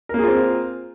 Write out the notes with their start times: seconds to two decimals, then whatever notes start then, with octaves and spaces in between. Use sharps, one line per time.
0.09 A#4
0.14 A#3
0.19 G#4
0.23 F4
0.28 C4